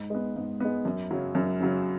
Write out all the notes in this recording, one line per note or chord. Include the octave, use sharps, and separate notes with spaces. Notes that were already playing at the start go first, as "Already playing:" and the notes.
Already playing: G#2
G#3 B3
G#2
G#3 B3
F#2
C#3 F#3
F#2
C#3 F#3